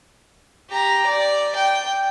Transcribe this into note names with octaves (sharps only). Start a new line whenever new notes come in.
G4 A#5
D5
G5